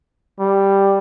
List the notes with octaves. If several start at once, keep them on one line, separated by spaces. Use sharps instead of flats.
G3